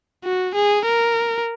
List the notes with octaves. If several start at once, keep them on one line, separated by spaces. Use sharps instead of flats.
F#4
G#4
A#4